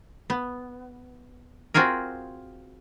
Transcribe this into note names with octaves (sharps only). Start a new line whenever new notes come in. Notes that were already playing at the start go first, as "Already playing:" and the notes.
B3
C4 F4 F#4 G#4 A#4